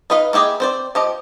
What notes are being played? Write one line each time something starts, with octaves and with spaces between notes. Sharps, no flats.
D#4 A#4 B4 D#5 F5
A#3 E4 G4 G#4 D#5
C4 C5 D5
F3 G4 D#5